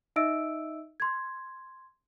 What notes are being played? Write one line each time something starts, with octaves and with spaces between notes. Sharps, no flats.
D#4 D#5 E5 E6 D7
C6 G#6